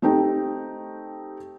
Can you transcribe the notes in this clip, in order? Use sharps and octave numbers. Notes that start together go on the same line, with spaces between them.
A3 C4 D#4 G4 G5